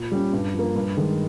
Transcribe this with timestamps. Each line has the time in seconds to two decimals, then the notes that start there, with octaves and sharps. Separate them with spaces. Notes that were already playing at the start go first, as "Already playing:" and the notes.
Already playing: A#2
0.12 G3 C#4
0.33 G2
0.54 F3 A#3
0.76 G2
0.97 D#3 G#3